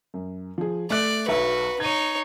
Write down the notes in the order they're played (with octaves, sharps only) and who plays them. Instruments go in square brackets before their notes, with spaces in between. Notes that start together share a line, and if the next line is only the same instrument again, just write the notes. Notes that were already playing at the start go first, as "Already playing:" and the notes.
[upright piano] F#2
F3 G#4
[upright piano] A3 E5 F#6 [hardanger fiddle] D5
[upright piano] B1 E5 C#7 [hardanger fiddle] F#4 B4
[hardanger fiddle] D#4 C#5 [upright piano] G#6 D#7